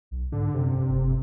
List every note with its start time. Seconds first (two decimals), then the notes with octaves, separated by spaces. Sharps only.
0.11 B1
0.32 G#2 D3
0.54 F#2 C3
0.75 G2
0.89 F#1